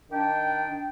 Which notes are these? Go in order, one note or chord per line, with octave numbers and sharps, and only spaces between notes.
D#3 D4 G5